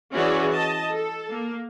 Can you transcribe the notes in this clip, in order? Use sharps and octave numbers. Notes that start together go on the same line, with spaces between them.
E3 C#4 F#4 G#4 C#5 D5
D#5 A5
A4
A#3